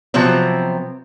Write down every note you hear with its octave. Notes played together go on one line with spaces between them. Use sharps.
C3 F3 F#3 B3 C4